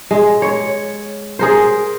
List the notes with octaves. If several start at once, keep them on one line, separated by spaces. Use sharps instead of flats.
G#3
C#5
G#4 A#4 C5